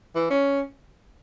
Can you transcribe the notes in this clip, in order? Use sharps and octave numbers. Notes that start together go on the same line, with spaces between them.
E3
C#4